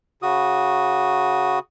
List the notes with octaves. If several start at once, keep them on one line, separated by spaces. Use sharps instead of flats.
C#3 F#4 D#6